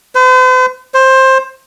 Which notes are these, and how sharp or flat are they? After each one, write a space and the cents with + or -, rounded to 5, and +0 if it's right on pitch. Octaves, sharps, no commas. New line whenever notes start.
C5 -45
C5 +15